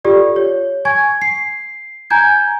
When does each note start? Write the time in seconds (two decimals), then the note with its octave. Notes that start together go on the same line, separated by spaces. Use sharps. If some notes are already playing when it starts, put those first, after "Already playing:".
0.05 F4 G4 A4 D5
0.36 C#5
0.85 G#5 C#6 G#6
1.22 C7
2.10 G#5 A#5 G6 G#6